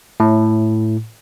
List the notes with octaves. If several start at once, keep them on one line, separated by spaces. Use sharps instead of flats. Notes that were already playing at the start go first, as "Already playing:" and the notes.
A2